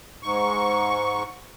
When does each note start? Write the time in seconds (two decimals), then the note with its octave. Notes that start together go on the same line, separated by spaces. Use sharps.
0.23 G#2 C#6